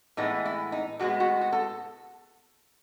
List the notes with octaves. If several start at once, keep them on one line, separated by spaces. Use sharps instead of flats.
A2 E3 G#3 B3 D#4
E4
D#4
A2 G#3 B3 F#4
F#4
F#4
A4